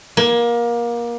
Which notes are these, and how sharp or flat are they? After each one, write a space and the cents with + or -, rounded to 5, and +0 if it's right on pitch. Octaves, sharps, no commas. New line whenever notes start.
A#3 +25